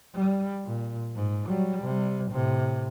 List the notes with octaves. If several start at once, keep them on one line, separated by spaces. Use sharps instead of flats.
G3
A#2
G#2
F#3 G3
C3 G3
A2 C3